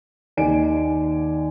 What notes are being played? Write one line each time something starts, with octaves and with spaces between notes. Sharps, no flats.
D#2 D#3 D5 G#5 D7